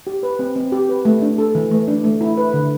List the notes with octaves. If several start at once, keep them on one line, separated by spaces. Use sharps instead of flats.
G4
B4
C4
C4
G4
B4
A3
D4
A4
E3
A3
D4
A3
E4
B4
D3